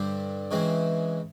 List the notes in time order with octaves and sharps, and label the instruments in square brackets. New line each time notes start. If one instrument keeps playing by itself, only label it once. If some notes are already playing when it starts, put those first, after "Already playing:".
Already playing: [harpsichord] G2 D3 G3 C4
C#3 E3 G#3 C4